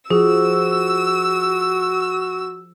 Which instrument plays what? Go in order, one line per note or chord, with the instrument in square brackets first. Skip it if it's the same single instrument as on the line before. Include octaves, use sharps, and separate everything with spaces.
[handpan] F3 [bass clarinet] F#4 [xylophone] G#4 [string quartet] E6